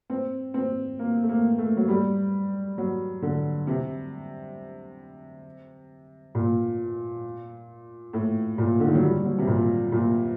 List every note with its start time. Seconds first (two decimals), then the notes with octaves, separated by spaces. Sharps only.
0.10 C4
0.54 C4
0.99 A#3
1.23 A3
1.29 A#3
1.58 A3
1.77 F#3
1.88 G3
2.78 F#3
3.22 D3
3.67 C3
6.35 A#2
8.13 A2
8.58 A#2
8.80 D3
8.88 D#3
8.95 F#3
9.03 G3
9.25 F#3
9.38 C3
9.47 A#2
9.92 A#2